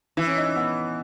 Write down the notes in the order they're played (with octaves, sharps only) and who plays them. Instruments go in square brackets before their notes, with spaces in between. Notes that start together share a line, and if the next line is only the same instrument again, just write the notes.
[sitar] E3 [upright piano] E4
[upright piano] C#4
D#4
C#4
B3